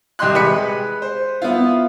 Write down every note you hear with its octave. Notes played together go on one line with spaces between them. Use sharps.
C2 G4 D#5 C6 F#6
G#3 B4 B6 C#7
C5
B3 E4 F4